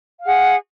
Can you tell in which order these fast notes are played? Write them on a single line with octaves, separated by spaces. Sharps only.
F5 G#4 F#5